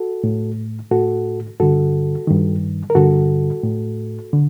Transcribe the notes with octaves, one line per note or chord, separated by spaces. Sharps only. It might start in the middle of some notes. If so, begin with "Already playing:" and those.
Already playing: F#4 A4
A2
A2 F#4 A4
G2 D3 F#4 A4
G2 D#3
A#4
G2 D3 F#4 A4
A2
D3